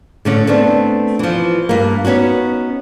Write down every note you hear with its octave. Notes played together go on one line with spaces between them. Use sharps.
A2 D3 C#4
A3 B3 C4 D4
E3 F3
G2 A#3
B3 C#4 D#4 F#4